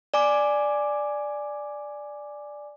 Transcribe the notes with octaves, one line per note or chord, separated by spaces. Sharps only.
D5 G#5 D6